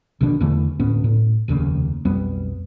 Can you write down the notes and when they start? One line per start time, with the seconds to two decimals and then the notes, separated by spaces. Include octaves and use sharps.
0.21 A#1 B2 D#3 D4
0.40 E2 D3 E3 A3
0.79 D2 A2 B3 C#4
1.04 A2
1.48 F1 D#2 A#2 C#3
2.05 B1 F2 G3 B3